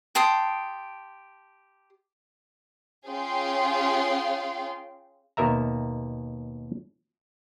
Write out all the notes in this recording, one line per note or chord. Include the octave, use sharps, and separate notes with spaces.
G4 A5 C6 D#6
C#4 F4 G#4 F5 G5 C6
D#2 B2 A#4 E5 A#5